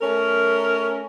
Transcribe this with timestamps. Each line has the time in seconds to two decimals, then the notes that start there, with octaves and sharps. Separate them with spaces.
0.01 A3 C#4 A#4